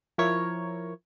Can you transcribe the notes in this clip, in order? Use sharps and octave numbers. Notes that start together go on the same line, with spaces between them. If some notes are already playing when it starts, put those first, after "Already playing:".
F3 E4 A#4 C#5